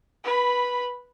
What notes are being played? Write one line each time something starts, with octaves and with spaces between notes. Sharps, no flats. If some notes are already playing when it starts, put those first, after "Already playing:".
B4 B5